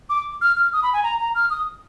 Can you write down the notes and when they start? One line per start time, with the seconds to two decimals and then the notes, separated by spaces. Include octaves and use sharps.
0.09 D6
0.41 F6
0.57 F6
0.73 D#6
0.83 B5
0.93 G#5
1.03 A#5
1.19 A#5
1.35 F6
1.50 D#6